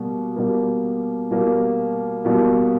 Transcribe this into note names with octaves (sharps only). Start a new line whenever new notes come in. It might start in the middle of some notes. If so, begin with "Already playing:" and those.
Already playing: B2 G3 A#3
B2 G3 A#3
B2 G3 A#3
B2 G3 A#3